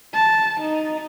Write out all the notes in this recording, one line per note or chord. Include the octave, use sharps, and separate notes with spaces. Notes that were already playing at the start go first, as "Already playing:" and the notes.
A5
D#4